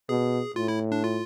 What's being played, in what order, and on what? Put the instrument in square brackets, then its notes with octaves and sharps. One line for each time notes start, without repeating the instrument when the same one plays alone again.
[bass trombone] B2 [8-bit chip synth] G#4
[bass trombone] A2 [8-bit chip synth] F4
[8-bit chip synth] E4
D4
F4